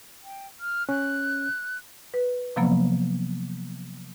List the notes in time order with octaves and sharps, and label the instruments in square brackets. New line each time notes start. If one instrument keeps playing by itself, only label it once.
[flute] G5
F6
[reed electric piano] C#4 [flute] F#6
[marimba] B4
C3 F3 F#3 A#3 B3